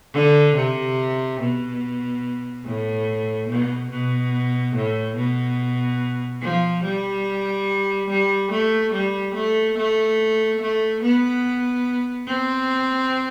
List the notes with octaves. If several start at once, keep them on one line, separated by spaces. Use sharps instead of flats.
D3
C3
B2
A2
B2
B2
A2
B2
F3
G3
G3
A3
G3
A3
A3
A3
B3
C4